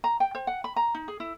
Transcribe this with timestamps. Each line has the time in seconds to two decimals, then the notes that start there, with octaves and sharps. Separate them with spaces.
0.04 A#5
0.20 G5
0.35 C5
0.47 F#5
0.64 B5
0.76 A#5
0.95 D#4
1.08 G#4
1.20 E4